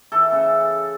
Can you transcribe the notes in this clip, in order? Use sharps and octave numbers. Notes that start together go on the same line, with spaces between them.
E3 A4
C#3